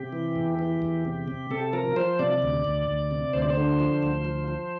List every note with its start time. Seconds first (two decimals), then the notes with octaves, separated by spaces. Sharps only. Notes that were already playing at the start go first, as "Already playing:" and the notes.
Already playing: C3 G4
0.13 E3
0.36 E2
0.59 E3
0.82 E2
1.05 C3
1.28 C3
1.51 C3 A4
1.73 F3 A#4
1.96 F3 C5
2.19 C3 D5
2.42 D2
2.64 D2
2.87 D2
3.11 C3
3.33 D2 C5
3.42 D5
3.50 C5
3.57 D3
3.80 F3
4.03 D2
4.25 F3
4.48 F3